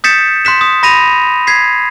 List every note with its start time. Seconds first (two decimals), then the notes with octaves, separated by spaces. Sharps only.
0.04 D#6 G6 A6 B6 C#7 E7
0.45 C6 F#6 B6 E7
0.61 D#6
0.83 B5 A#6 D#7 F7
1.47 G#6 B6 C7